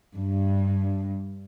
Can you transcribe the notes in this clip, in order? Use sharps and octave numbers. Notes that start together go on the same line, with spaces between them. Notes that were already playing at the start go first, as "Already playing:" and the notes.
G2